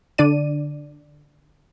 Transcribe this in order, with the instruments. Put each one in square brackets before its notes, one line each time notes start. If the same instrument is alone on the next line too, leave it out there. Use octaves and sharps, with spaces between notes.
[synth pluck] D3 D4 D5 D#7